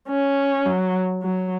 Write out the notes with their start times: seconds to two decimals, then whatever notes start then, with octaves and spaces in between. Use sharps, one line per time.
0.09 C#4
0.66 F#3
1.23 F#3